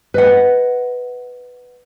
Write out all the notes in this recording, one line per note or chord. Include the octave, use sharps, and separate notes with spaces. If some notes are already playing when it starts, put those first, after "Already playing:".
B4 D#5 F#5